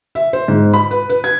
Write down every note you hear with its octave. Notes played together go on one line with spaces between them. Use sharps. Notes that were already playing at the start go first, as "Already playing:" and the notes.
E5
C5
G#2
B5
B4
B4
G#6